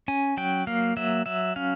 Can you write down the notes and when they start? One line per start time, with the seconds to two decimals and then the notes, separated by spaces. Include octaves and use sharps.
0.08 C#4 G#5
0.37 F#3 G5
0.67 A#3 F5
0.97 F#3 E5
1.26 F#3 E5
1.56 C#4 F5